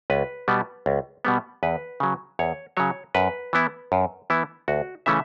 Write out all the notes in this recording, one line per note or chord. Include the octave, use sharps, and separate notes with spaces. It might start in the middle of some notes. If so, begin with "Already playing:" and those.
C#2 B4
B2 G3 B3
C#2
B2 G3 B3
E2 B4
C#3 F#3
E2 C#5
C#3 F#3 C#5
F#2 B4
E3 B3 E4
F#2
E3 B3 E4
D2 F#4
C#3 E3 A3 C#4 E5